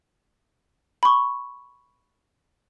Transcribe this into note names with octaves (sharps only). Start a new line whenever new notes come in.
B5 C#6